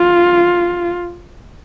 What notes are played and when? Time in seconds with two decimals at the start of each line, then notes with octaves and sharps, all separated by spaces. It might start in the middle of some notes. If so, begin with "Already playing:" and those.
Already playing: F4